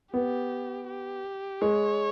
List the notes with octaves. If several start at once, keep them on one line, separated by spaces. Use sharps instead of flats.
B3 G4
G4
G#3 C#5